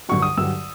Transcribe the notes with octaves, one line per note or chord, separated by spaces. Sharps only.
G2 D3 F#3 C#6
D#6
G2 D3 F#3 E6